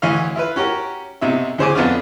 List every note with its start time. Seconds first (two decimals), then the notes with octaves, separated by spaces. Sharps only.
0.02 D2 E3 C#4 C#5 F5 F6
0.35 E4 F4 B4
0.56 C#4 F#4 G4 A#4
1.21 B1 C3 D#4 E5
1.58 D2 C#3 C5 C#5 G#5 D6
1.75 F2 B3 D4 F4